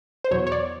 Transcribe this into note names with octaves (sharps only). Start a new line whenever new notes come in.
C5
E2 B2 F#3 C#5
C#5
D5